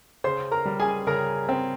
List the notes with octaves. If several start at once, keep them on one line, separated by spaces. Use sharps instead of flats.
C#3 C5 C6
A#4 A#5
G3
G#4 G#5
C#3 A#4 A#5
C4